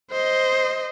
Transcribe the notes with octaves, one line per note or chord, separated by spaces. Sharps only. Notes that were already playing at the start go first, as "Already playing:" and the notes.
C5 D#5